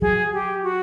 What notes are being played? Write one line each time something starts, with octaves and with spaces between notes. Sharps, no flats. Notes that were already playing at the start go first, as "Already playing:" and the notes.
F#3 G#4
G4
F#4